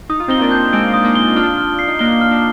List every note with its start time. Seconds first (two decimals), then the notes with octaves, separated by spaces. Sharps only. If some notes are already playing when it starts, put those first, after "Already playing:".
0.09 D#4 D#6
0.20 F4
0.28 C4 D#4 G7
0.41 A#3 D4
0.51 G6
0.73 G#3 C4 D7
0.94 D#6
1.04 A#3 D4
1.15 G7
1.36 D4 F4 F6
1.58 F6
1.79 C7
1.88 D#4
1.99 A#3 D4 G7
2.21 F6
2.31 A#3 D4